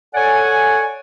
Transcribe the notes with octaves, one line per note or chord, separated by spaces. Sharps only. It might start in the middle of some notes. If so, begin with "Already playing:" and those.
A4 C#5 D5 F#5 G#5